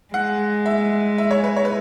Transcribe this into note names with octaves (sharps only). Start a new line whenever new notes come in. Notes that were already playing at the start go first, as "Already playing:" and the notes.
G#3 F#5
E5
E5
C#5
B4
C#5
B4